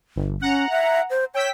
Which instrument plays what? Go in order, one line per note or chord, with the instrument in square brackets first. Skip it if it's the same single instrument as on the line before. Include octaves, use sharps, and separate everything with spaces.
[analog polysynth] G1
[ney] C#4 [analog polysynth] F#5 A#5
[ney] E5
C5
[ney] C#5 [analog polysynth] G5 E6 B6